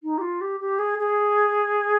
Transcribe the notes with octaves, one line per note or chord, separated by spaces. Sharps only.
D#4
G4
F4
G4
G4
G#4
G#4